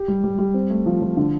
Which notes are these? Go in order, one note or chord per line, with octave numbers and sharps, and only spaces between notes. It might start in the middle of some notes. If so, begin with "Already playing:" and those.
Already playing: G4
G3
G3
G3
C4
A3
F3
F3
D3